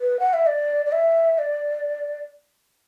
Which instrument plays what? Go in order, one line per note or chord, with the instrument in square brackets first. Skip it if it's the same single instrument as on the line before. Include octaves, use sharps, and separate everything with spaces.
[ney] B4
F#5
E5
D5
D5
E5
D5